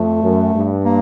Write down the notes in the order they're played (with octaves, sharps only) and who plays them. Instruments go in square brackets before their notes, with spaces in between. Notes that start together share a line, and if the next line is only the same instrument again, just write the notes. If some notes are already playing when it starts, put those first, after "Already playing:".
Already playing: [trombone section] F2 [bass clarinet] A3
[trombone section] F#2
G2
[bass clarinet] A#3